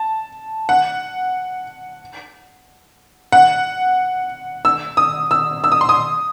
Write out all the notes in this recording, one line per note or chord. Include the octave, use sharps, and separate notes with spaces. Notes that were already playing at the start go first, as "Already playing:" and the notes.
Already playing: A5
F#5
F#5
E6
D#6
E6
E6
D#6
C6
D#6